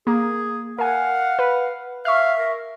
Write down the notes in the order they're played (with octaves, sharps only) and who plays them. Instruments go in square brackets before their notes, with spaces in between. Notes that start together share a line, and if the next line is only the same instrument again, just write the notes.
[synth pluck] A#3 [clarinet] G#4
[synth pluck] A#4 G#5 [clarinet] F5 [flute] F#5
[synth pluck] B4
[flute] E5 [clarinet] F5 [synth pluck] C#6 F6
[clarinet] A#4